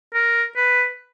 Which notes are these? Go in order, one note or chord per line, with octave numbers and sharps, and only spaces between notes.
A#4
B4